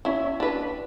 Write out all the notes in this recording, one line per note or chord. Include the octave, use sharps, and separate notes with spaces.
C#4 E4
D4 B4